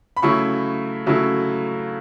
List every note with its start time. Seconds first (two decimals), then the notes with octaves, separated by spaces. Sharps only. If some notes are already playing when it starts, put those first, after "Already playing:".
0.17 B5
0.22 C#3 F#3 A3 E4 C#6
1.06 C#3 F#3 A3 E4